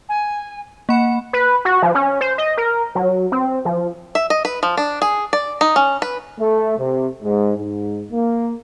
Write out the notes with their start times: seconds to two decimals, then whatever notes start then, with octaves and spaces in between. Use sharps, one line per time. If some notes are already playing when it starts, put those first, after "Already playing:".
0.09 G#5
0.89 A#3 F#5 B5
1.33 B4
1.65 F#4
1.82 F3
1.95 C#4
2.21 C5
2.38 D#5
2.57 A#4
2.95 F#3
3.32 C4
3.65 F3
4.15 E5
4.30 D#5
4.45 B4
4.63 F3
4.77 D4
5.02 G#4
5.33 D5
5.61 D#4
5.76 C#4
6.02 B4
6.40 A3
6.78 C3
7.22 G#2
7.58 G#2
8.12 A#3